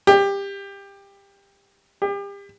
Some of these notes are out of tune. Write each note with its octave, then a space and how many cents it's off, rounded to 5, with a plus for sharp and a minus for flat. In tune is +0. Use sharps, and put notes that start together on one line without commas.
G4 +20
G4 +35